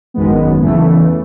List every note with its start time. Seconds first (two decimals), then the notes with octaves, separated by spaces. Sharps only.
0.14 G#1 F#2 D#3 G#3 B3
0.62 E2 C#3 E3 A3